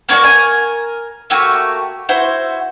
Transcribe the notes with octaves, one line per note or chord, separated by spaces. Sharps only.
A#3 C#4 F#4 D5
A#4 G#5
A3 A#3 F#4 G4
E4 F#4 C5